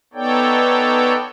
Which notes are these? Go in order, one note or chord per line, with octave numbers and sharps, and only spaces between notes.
B3 D#4 A4 C#5 D5 G5